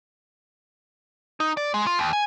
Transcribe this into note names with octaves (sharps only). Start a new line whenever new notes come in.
D#4
D5
G#3
F4
D#2
G#5